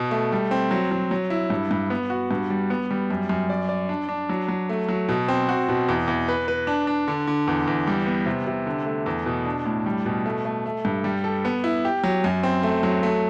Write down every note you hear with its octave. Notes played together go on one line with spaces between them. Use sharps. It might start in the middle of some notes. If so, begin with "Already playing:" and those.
Already playing: B2
A3
G3
C4
F#3
F#3
F#3
E4
G2
G2
B3
F#4
G2
G3
B3
G3
F#2
F#2
D5
D5
D4
D4
F#3
F#3
A3
F#3
B2
C4
F#4
B2
E2
E2
B4
B4
D4
D4
D3
D3
E2
E2
G3
B3
C3
C3
D3
A3
E2
B2
D4
A2
G3
B2
A3
A3
A3
G2
G3
A4
B3
E4
G4
F#3
F#2
C4
A3
F#3
A3